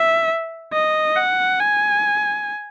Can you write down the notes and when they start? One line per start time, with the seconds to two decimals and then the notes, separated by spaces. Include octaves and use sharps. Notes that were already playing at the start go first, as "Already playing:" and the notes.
Already playing: E5
0.73 D#5
1.16 F#5
1.60 G#5